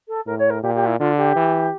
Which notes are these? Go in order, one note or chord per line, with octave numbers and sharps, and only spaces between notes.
A4
A2 A#4
C#5
A#4
A#2 G4
G4
E4
D3 F4
G4
E3